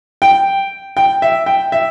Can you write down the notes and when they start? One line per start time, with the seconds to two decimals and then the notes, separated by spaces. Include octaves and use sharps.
0.22 G5
0.97 G5
1.22 E5
1.46 G5
1.72 E5